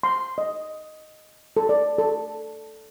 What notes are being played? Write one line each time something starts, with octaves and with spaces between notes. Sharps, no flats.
C6
D#5
A4
D5
A4